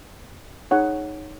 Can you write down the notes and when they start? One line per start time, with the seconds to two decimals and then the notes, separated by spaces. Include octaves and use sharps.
0.71 D#4 G#4 C#5 F#5